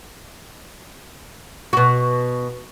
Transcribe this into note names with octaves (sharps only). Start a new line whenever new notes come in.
B2 F#4